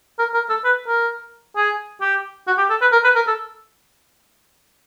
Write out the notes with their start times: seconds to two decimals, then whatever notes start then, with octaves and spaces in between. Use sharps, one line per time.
0.19 A#4
0.34 A#4
0.49 A4
0.64 B4
0.88 A#4
1.56 G#4
2.01 G4
2.47 F#4
2.58 G4
2.70 A4
2.81 B4
2.92 A#4
3.04 B4
3.16 A#4
3.27 A4